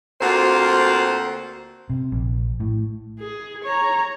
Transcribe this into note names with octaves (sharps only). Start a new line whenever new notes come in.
D2 A#3 C4 F4 F#4 C5
C3
A#1
A2
G#4
C#5 A#5